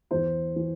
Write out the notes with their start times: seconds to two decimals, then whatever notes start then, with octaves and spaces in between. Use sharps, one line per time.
0.11 E2 E3 C5
0.56 E3